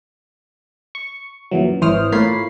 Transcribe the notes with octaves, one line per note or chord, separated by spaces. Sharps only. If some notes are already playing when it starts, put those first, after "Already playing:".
C#6
F#2 A#2 E3 F#3
G#1 E3 C5 C#5 D#6 F6
A2 A#3 F4 C#5 B5 C7